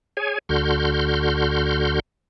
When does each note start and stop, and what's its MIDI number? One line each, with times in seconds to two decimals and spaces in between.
0.17 0.38 68
0.17 0.38 73
0.17 0.38 80
0.49 2.00 38
0.49 2.00 50
0.49 2.00 66
0.49 2.00 84
0.49 2.00 89
0.49 2.00 91